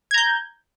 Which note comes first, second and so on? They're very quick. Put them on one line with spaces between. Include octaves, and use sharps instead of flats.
G#6 A#5 G6